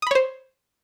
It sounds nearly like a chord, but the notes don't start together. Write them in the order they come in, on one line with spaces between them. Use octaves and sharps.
D#6 B5 C#5 C5